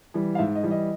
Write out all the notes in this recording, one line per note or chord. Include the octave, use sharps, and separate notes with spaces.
E3 G3
F5
G#2 E5
D#5
E3 G3
D#5